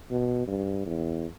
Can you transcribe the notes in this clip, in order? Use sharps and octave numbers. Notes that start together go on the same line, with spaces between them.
B2
G2
E2